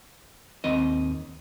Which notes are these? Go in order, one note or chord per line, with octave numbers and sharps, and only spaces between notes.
D#2 C4 D#5